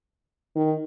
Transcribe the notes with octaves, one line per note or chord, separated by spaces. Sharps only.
D#3